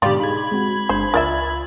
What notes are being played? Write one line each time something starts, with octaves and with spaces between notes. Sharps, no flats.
G#2 B2 D3 G3 F4 G4 D5
D#4 G#4 B5 G#6
G#3 C4 F#4
G1 G#3 D4 C5
C#2 F4 A#4 D5 E5 A6